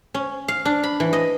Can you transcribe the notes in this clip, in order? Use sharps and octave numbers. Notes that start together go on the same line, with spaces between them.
C#4
F5
D4
B5
E3
D#5